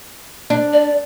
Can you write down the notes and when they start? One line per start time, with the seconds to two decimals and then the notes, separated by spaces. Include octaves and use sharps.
0.50 D4
0.73 D5